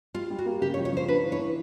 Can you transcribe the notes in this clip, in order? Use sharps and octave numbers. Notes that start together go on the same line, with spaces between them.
G3 F4
G3
F#4
A#3
C#3 G4
C#5
F3
C#5
F3 C5
D4 B4
E3
C#5
E3